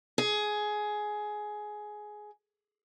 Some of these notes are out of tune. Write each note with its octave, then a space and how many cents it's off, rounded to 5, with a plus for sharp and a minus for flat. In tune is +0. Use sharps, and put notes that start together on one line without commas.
G#4 +15